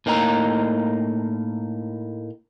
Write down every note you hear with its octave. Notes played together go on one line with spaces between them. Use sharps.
A2 A#3 D#4 G#5 A#5